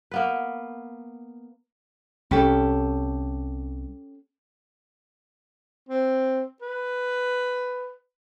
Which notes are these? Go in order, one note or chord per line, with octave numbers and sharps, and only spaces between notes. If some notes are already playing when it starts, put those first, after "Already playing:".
A#3 B3 B4
C2 C#4 G4 A4
C4
B4